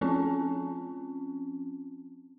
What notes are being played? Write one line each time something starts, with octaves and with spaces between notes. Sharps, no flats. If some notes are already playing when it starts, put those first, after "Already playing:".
F3 C4 C#4 F4